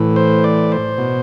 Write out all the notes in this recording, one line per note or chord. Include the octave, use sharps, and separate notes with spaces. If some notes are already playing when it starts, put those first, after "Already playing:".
Already playing: A2 E3
C5
D5
C5
B2